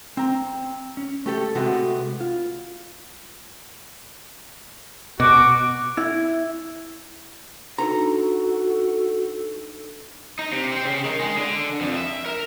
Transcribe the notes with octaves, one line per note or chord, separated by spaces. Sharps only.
C4 A#5
C#4
A3 G4 A4
C3 G#3 A3 B3 F#4
F4
B2 F#4 D6
E4
D4 D#4 F#4 A4 B4 A#5
D#4
C3
C4
C#3
D#3
G#3
D3
F2
E5
A#4